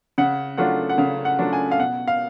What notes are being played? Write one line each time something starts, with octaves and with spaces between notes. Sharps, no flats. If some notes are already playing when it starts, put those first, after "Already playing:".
C#3 F#5
F#3 A3 D4 F4 F#5
F#5
C#3 F5
F#5
F#3 A3 D4 F4
G#5
F5
B2 F#5
F5